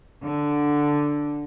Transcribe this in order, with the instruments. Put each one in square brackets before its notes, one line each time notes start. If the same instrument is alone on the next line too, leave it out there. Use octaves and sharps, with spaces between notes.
[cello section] D3